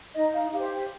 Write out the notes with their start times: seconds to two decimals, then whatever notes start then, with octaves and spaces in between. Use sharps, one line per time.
0.15 D#4 D#5
0.33 F5
0.53 G4 F5
0.57 C5